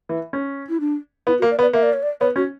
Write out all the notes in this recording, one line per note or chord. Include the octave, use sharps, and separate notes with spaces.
E3
C#4
E4
D4
B3 E4
F#4
A#3
D5
B3
D5
A#3 E5
D5
C#5
D5
B3 C#5
C#4 F#4